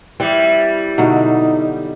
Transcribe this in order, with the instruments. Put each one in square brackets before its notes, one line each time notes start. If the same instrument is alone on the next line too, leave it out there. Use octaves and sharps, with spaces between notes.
[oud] E3 [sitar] G3 [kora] C4
[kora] B2 D3 F#3 [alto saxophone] D#4